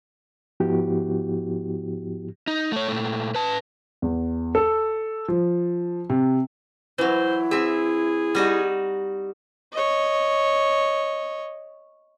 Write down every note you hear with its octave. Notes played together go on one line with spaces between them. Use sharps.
G#2 F3 B3 E4 F#4 G4
D#4
A3 C#5
A#2 A3
B4 A5
E2
A4
F3
C3
E3 F#3 E4 C5
C4 G#4 E5
G3 D#4 F#4
C#5 D#5